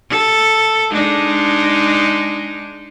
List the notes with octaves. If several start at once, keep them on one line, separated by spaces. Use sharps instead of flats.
A4
G#3 D4 D#4